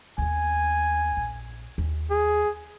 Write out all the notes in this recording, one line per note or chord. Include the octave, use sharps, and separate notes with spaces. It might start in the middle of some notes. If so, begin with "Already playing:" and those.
D#2 B3 G#5
A#1
D#2
G#4